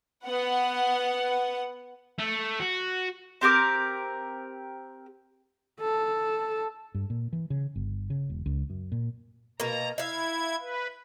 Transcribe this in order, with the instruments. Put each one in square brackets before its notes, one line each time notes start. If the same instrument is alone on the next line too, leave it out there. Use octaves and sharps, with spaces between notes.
[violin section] B3 F#5
[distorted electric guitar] A3
F#4
[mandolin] C4 G4 A#4 D6
[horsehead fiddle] A4
[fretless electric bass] G2
A#2
E3
C#3
G1
C#3
E1
C#2
F#2
A#2
[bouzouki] B2 A#3 [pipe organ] A#5
[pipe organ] E4 G#6 [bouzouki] E5 F5
[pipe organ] B4